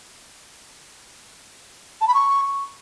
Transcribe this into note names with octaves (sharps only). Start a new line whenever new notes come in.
A5
B5
C#6